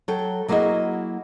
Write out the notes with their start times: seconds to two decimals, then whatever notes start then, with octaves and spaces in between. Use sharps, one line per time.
0.08 F#3 A4 G5
0.48 F#3 A#3 E4 F#4 G#4 D#5